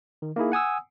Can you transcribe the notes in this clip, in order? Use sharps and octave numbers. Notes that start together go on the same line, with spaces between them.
D#3
A#3 D#4 E4 G#4
F#5 G#5 D#6 E6